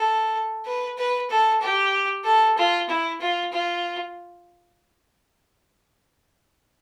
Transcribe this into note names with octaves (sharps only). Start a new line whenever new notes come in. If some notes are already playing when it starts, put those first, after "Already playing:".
Already playing: A4
B4
B4
A4
G4
A4
F4
E4
F4
F4